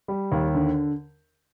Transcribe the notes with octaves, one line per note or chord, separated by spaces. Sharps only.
G3
D#2
D3